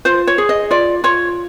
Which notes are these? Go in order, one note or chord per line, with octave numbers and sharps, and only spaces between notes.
F4 C5
C#5
G#4
D#5
F4 D5
F4 C#5